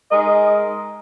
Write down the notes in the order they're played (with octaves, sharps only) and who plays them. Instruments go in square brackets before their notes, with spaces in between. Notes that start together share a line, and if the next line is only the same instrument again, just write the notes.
[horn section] G#3 D#4 A#4 D#5